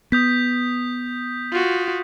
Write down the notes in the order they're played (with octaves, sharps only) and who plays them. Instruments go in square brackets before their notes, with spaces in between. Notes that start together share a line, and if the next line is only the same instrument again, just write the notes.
[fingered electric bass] B3 [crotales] D#6 G6 B6
[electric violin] F4 F#4